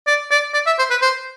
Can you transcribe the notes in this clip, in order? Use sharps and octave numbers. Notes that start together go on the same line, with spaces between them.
D5
D5
D5
E5
C5
B4
C5